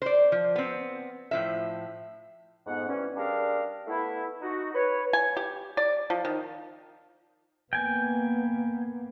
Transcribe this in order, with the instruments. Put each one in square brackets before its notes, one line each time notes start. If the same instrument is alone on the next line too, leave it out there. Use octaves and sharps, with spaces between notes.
[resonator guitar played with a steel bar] C5 D5
F3
B3 C4
A2 F3 E5
[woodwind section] F2 G#2 B3 F#5
E3 G3 C#4
G3 D4 G#4 A#4 F5
A3 B3 E4
D#4 F#4
B4 C#5
[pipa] G#5
G4
D5
F3
D#3
[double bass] A#3 B3 [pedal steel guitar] G5 G#5